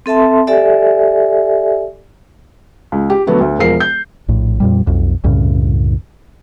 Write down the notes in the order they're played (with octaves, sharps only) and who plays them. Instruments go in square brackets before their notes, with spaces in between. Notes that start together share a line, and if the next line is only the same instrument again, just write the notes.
[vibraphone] C4 A4 E5 A5 C6
G4 A4 D5 E5 G#5
[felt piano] C#2
G4
D3 F#3 A3 B3 D4
D2
E1 F3 A#4 C7
G6
[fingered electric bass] A#1 A2
F2 A#2 G3
B1 F2
C2 F#2 A2 C#3